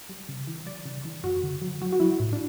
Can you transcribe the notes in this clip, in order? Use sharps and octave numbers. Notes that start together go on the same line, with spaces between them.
G3
C#3
E3
G3 D5
C#3
E3
F#2 F#4
D3
F#3
F#3 F#4
F#4
F#3 E4
A2
D4